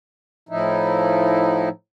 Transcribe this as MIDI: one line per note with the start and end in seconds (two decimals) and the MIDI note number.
0.49 1.69 45
0.49 1.69 53
0.49 1.69 63
0.49 1.69 64